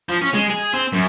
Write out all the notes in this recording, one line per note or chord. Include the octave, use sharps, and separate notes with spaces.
F3
C#4
G#3
G#4
C4
F#2